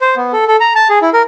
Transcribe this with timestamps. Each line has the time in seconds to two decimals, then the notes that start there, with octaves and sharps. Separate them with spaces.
0.01 C5
0.16 B3
0.33 A4
0.48 A4
0.61 A#5
0.76 A5
0.90 G#4
1.02 E4
1.14 A#4